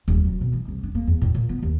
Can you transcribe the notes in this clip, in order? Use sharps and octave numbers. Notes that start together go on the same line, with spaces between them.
D#1
F#3
B2
E3
C2
D4
A#3
E2
A2
A#2
B3
D#2